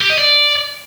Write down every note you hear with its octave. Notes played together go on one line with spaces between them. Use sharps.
G4
D#5
D5